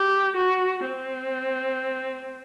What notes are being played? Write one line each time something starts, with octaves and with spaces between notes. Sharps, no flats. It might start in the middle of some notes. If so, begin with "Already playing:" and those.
Already playing: G4
F#4
C4